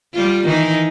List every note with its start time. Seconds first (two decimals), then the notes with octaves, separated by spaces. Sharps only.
0.14 G3 F4
0.46 D#3 E3 D#4